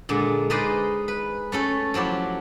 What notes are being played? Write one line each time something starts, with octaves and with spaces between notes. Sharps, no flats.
A#2 D3 G#3
D#4 G#4 B4 C5 D5 D#5
B4
A3 C#4 A4
F3 F#3 E4 G4